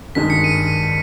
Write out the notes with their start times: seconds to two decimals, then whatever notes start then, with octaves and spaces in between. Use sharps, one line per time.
0.15 G#1 G2 D#3 G#3 B6
0.30 C#7
0.44 D#7